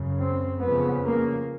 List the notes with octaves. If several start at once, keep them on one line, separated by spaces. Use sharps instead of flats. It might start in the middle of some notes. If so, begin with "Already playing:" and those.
Already playing: F#2 C#3
C4
F2 C#3 B3
A#3